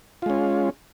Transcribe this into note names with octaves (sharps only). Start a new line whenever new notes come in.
G#3 C#4 F4